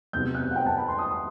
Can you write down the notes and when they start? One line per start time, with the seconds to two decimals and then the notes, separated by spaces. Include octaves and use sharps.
0.13 E2 C3 F#3 B3 G6
0.35 F#6
0.51 F#5
0.56 G5
0.66 A5
0.78 B5
0.88 C6
0.99 D#6